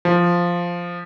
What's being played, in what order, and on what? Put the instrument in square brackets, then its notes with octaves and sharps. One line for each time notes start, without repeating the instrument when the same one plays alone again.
[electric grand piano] F3